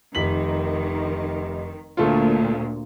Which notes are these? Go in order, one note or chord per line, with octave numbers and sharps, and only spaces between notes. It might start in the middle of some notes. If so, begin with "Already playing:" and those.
F1 D#3 B6 F#7
D2 A#2 A3 F4